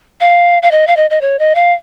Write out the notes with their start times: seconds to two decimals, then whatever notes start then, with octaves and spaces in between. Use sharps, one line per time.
0.20 F5
0.63 F5
0.71 D#5
0.87 F5
0.96 D#5
1.10 D#5
1.21 C#5
1.39 D#5
1.55 F5